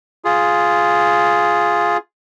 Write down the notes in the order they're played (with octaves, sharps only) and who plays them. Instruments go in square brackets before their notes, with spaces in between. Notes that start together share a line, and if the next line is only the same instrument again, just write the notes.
[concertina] F4 G#4